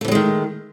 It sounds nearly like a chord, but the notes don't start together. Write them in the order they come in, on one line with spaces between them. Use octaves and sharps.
A3 E3 F#3 G#3 D#3